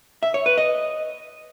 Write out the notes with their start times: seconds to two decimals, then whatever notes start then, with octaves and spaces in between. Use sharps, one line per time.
0.23 E5
0.34 C#5
0.46 B4
0.58 D#5